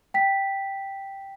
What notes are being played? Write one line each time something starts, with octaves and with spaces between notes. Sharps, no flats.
G5 B6